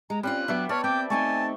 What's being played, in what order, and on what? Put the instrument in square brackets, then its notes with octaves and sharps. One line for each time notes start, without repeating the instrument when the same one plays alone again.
[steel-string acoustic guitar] G#3 [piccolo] A#5
[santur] G3 [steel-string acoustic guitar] C4 C#4 F4 [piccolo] F#6
[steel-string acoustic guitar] F#3 B3 D4 [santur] E5 D6
[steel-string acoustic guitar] B4 [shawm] C#5 [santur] D5 A5 [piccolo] F6
[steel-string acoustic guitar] C4 [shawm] G5 [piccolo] D6
[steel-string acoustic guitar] A3 C4 D#4 [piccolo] G#5 [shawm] A5 [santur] C#6